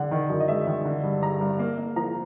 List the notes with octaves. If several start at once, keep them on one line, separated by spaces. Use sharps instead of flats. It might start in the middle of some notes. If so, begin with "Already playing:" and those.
Already playing: D3 F#5
D#3
F#2
D#5
G#3 E5
D#3
D3
G2
G2 A#5
G2
A#3
A#3
F3 A#5